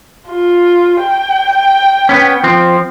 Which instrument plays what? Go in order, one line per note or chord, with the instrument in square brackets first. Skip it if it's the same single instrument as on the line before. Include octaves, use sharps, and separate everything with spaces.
[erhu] F4
G5
[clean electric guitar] B3 C#4
F3 C4